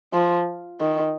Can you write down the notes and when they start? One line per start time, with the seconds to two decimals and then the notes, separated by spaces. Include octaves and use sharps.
0.13 F3
0.80 D#3